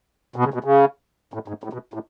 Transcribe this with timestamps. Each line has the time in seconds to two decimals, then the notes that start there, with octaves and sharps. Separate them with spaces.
0.36 B2
0.44 C#3
0.54 B2
0.64 C#3
1.34 A2
1.48 G#2
1.64 A2
1.73 B2
1.94 A2